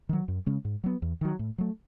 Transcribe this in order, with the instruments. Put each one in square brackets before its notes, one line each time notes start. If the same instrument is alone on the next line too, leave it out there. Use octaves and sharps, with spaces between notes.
[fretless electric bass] D#3 F#3
F#2
C#3 G#3 C#4
G#2
F#3 B3
E2
D#3 F#3
A2
F#3 A3